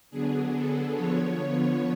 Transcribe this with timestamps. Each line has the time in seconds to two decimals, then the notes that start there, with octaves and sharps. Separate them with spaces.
0.10 D3 F#3 B3 D4 G#4
0.53 A4
0.96 D3 F3 B3 C#5